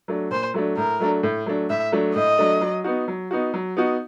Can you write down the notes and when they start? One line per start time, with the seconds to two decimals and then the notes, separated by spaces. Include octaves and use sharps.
0.08 F#3 A3 D4
0.31 A#2 C5
0.54 F#3 A3 D4
0.77 A2 A#4
1.00 F#3 A3 D4
1.23 A2
1.46 F#3 A3 D4
1.70 A2 E5
1.92 F#3 A3 D4
2.15 A2 D#5
2.38 F#3 A3 D4
2.61 F#3
2.84 B3 D#4 F#4
3.08 F#3
3.31 B3 D#4 F#4
3.54 F#3
3.77 B3 D#4 F#4